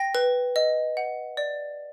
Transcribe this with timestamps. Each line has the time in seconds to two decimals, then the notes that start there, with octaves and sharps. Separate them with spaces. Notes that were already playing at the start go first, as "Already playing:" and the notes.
Already playing: G5 A#6
0.15 B4
0.56 D#5
0.97 F#5
1.37 D5